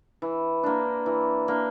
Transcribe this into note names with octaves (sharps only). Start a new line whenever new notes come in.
E3
A#3 D4
E3
A#3 D4